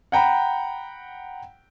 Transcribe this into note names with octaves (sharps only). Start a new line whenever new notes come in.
F#5 G5 A#5 B5